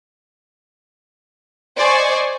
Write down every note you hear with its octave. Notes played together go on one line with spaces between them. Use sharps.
C5 D5 D#5 G#5 C#6